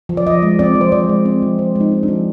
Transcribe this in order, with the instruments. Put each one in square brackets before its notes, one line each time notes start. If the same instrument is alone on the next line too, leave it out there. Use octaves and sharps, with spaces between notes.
[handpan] F3
D5
F3 D#5
G#3
C4 D5
F3
C5
F3 D5
G#3
C4
F3
F3 C5
G#3
D#4
C4
D4
F3